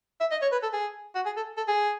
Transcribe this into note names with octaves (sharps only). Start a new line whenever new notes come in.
E5
D#5
C#5
B4
A4
G#4
F#4
G#4
A4
A4
G#4